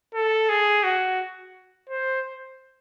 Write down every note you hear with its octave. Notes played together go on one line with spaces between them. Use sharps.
A4
G#4
F#4
C5